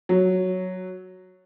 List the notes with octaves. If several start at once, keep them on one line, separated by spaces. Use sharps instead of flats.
F#3